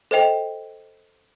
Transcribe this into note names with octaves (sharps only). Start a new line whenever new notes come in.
A4 C5 D#5 G5 F7